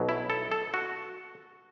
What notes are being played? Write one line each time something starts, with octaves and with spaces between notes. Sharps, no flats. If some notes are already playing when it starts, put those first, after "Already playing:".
Already playing: B1 B2 F#3
E4
A4
A4
F#4